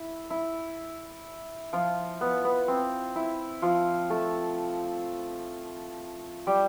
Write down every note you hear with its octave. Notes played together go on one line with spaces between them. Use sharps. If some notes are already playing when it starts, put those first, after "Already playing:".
Already playing: E4
E4
F3 F4
B3
B3
C4
E4
F3 F4
A3 A4
G3 G4